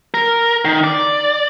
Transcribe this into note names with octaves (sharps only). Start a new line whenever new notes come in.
A#4
D#3
D5